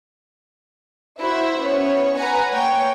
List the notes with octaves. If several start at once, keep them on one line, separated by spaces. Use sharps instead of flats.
E4 F#4 C5 E5
B3 C#4 C#5
B4 F#5 G#5 A#5
A#3 C#5 G5